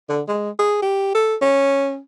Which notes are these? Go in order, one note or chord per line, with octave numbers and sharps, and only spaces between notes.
D3
G#3
G#4
G4
A4
C#4